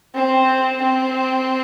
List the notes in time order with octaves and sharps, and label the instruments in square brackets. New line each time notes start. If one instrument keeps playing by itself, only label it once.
[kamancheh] C4
C4